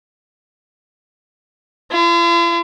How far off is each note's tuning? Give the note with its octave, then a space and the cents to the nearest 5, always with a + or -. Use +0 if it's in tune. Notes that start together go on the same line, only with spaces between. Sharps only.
F4 -45